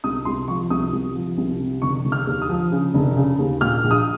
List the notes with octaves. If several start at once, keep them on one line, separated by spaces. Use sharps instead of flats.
C2 D#6
C2 C6
F3 C#6
C2 D#6
C2
F3
C2
C3
F1 C#6
F1
F6
D#2
D#6
F3
C#3
F1
C#3
D#2
A#2 F6
A#1
D#6